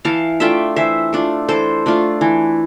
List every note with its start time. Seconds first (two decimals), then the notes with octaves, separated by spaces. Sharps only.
0.05 E3 F5 A5
0.40 A3 D4 F4 E5 G5
0.76 E3 C5 E5
1.13 A3 D4 F4
1.49 E3 A4 C5
1.86 A3 D4 F4
2.21 E3